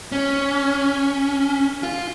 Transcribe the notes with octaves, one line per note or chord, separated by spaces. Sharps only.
C#4
F4